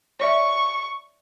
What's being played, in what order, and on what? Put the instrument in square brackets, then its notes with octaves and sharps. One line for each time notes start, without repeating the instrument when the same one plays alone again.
[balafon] C#5 D5 E5 [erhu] C#6